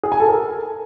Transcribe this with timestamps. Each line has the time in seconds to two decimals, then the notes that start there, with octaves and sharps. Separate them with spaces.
0.03 G#4
0.12 G#5
0.20 A4
0.28 A#4